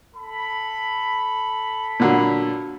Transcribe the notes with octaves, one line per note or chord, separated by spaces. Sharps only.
A4 B5
A#2 D3 F#3